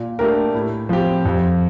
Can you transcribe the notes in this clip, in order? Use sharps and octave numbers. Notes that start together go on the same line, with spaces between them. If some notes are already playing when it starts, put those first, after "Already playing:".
Already playing: A#2
A3 D4 G4 A#4
A2
F3 C4 G4
F2